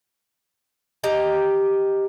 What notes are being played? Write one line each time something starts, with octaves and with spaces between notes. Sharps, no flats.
G4 D#5 A#5